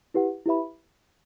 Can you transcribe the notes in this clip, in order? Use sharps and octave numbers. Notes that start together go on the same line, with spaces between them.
E4 G4 B4 F#5
E4 G4 B4 E5 B5